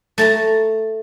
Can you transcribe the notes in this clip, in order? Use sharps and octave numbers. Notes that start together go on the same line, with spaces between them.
A3 A5 A#5